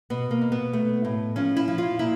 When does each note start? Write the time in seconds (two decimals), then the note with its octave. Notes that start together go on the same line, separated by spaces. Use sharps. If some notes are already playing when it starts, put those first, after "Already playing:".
0.10 B2 B3
0.31 A#3
0.41 B2
0.52 B3
0.73 A3
1.05 A2
1.36 F3 C#4
1.56 E4
1.68 F3
1.78 F4
1.99 A#2 E4